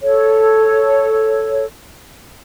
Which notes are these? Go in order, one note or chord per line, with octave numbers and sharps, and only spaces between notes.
A4 C#5